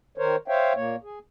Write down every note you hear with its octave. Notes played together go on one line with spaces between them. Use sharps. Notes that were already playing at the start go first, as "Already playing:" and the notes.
D#3 A#4 C5 C#5
C5 C#5 E5 F5 G5
A#2 A#3 C#5
G#4